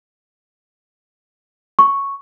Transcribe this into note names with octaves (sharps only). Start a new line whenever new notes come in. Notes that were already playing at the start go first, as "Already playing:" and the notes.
C#6